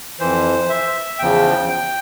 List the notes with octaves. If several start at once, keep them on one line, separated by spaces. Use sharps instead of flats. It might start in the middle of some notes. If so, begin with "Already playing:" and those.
F2 E3 C5
E5
E2 C#3 F3 G5
G5